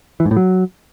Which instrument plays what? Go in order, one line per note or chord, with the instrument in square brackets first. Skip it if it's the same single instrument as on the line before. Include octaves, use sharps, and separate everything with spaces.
[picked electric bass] E3
G#2
A2
F#3